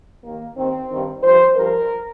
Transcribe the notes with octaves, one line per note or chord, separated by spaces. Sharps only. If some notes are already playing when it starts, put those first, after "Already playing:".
D#2 D#3 A#3
D#2 D#3 C4
G2 D#3
G2 F3 C5
G2 F3 A#4